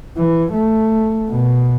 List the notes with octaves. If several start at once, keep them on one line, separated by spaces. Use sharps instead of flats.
E3
A3
B2